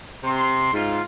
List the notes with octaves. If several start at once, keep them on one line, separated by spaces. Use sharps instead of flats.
C3 C6
G#2 F4